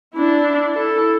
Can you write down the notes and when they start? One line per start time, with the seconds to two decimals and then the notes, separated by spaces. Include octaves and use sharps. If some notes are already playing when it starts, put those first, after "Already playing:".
0.14 D4 E4
0.75 E4 A4